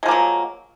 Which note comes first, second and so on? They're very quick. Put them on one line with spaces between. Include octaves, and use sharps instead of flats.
G#3 F3 A#3 F#3